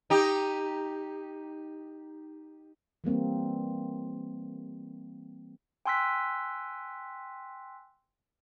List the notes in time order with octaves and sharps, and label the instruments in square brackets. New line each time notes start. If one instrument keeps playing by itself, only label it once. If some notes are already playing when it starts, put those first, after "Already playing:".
[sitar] D#4 G4
[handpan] E3 G3 A#3 C4
[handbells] G5 G#5 C6 E6 F#6 B6